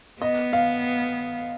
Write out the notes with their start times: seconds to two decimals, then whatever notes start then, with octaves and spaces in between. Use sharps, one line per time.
0.21 B3 D#5
0.53 F5